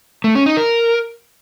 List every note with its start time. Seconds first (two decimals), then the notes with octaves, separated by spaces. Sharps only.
0.24 A3
0.35 C#4
0.46 D#4
0.57 A#4